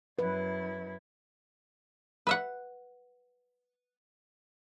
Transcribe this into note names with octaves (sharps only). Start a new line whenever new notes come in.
F#2 E4 B4
B4 E5 F#5